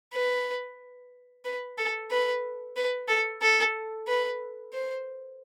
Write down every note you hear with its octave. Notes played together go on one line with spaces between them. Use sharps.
B4
B4
A4
B4
B4
A4
A4
B4
C5